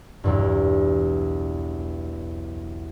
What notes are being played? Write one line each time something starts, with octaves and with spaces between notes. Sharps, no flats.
B1 E2 G2